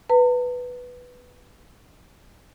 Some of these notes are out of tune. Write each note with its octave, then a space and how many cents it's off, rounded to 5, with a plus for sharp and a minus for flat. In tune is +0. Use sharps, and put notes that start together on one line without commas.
B4 +0 A#5 -45